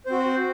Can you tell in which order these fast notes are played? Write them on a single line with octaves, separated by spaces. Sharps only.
C5 C4 F#4